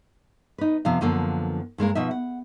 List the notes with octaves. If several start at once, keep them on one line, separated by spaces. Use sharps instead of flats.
D#4 B4
F2 C3 F3 B3 F5
F#2 D3 F3 A#3 B3
G2 G#3 A#3 A#4
B2 F3 D#4 E5
F#5